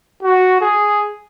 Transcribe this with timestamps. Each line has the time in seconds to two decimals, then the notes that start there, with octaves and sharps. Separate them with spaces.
0.23 F#4
0.61 G#4